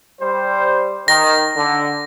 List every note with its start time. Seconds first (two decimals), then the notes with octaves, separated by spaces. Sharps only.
0.21 G3 C5
1.08 D#3 A#6
1.57 D3